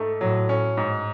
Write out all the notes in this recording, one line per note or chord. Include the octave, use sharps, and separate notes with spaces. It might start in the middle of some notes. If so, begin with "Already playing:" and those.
Already playing: G#2 A3
A2 F#3
C#4
G#2